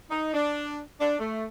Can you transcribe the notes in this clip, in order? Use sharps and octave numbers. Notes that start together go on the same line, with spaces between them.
D#4
D4
D4
A3